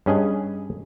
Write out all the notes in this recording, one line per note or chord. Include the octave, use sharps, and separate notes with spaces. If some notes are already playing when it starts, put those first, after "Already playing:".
G2 C#4 G#4 D#5 G#5